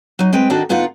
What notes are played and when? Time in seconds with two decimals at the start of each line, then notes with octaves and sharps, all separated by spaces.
0.19 F#3 D#4
0.33 G#3 C4 B4 G5
0.50 D#3 D4 D#4 F#4 A4
0.69 D3 B3 D#4 F4 F5 F#5